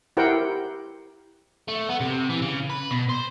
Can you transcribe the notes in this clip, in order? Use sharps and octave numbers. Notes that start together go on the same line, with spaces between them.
E4 G4 A#4 C5 F#5 G5
A3
B3
C3
E3
C#3
B4
B2
C5